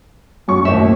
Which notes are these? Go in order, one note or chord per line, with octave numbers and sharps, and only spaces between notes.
F#2 C#6
D#2 A2 E5